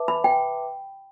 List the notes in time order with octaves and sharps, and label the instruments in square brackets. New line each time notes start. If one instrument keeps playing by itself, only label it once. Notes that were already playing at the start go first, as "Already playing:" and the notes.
Already playing: [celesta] B4 E5 A5 D6
[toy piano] B5
G5